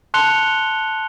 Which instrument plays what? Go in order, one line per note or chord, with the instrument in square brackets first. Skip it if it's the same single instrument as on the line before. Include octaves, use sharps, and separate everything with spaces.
[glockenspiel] A5 C6 F#6 C#7 F7 G7